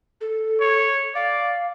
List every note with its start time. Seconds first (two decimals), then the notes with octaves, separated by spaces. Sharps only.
0.21 A4
0.60 C#5
1.15 D5 F5